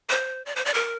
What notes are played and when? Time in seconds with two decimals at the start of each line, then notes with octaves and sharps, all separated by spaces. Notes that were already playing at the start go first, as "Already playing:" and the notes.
0.09 C5
0.46 D5
0.56 C5
0.65 D5
0.74 A#4